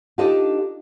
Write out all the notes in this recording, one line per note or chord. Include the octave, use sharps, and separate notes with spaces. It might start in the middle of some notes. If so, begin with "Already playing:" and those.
D4 D#4 F4 G4 A4 D#5